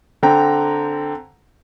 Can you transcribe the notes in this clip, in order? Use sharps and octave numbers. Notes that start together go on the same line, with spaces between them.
D3 C4 G5 A#5